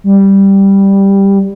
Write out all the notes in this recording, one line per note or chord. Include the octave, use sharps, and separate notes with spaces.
G3